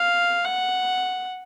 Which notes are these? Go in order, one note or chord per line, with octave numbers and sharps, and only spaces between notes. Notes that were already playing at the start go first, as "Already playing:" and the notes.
Already playing: F5
F#5